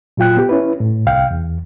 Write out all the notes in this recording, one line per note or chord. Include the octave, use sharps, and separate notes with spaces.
A#2 F#3 F4 G5 F#6
B3 G4
C#4 E4 B4
A2
C2 F5 G5
E2